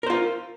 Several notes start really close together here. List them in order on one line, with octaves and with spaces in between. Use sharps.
A#4 C5 F4